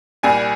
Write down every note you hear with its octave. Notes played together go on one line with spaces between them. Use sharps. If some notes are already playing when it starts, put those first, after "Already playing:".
C2 A#2 G3 G#5